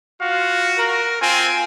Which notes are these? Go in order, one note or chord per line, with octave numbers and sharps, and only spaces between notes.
F4 F#4 F5
A#4
C4 F4 G#5